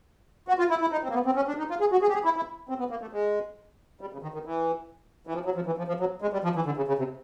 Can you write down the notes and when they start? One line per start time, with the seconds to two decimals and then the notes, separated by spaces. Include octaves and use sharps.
0.48 F#4
0.59 F4
0.70 E4
0.81 E4
0.92 D#4
1.03 C4
1.10 A#3
1.14 B3
1.26 C4
1.36 C#4
1.48 D4
1.58 D#4
1.70 F4
1.80 G#4
1.92 F#4
2.02 G#4
2.09 G4
2.14 G#4
2.25 E4
2.36 E4
2.69 C4
2.79 B3
2.90 A#3
3.01 A3
3.13 G#3
4.01 G3
4.13 C#3
4.23 D#3
4.34 D#3
4.45 E3
5.27 E3
5.34 F3
5.45 F#3
5.55 F3
5.66 E3
5.78 F3
5.88 F3
6.00 F#3
6.22 G#3
6.33 G3
6.44 F3
6.55 E3
6.66 D3
6.77 C#3
6.88 C#3
6.98 C3